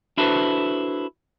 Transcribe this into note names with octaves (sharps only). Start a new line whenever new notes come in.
D4 E4 F#4 A4 B4 C5